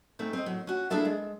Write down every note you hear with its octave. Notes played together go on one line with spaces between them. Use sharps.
G#2 A3 C4
C4 D#5
A2 F#3
C#4 F#4
A#3 D4 E4 G#4 A4 E5
G#3